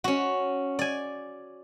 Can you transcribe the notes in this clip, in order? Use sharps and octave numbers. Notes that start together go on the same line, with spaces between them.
C#4 F#4
D5 G#5